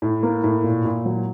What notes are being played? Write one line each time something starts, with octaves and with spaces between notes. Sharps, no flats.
A2
A#3
A2
A#2
A#2
F#3